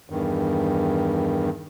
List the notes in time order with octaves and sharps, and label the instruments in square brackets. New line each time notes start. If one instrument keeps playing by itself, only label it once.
[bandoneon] E2 G2 D#3